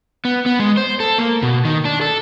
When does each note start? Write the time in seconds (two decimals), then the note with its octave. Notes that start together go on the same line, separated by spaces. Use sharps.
0.25 B3
0.46 B3
0.60 G#3
0.77 C5
1.00 A4
1.18 A#3
1.43 B2
1.65 D#3
1.85 D4
2.01 A4